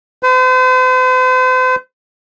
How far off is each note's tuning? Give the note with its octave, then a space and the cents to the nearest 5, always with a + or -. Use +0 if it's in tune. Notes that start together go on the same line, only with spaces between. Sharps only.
C5 -40